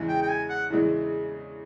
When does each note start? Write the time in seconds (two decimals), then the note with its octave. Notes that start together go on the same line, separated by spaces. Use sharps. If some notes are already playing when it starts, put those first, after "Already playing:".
Already playing: E2 C#3 E3 G#3
0.09 G5
0.22 G5
0.29 G#5
0.50 F#5
0.70 E2 C#3 E3 G#3